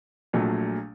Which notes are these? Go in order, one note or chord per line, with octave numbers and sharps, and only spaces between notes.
A#1 A#2 F#3 A3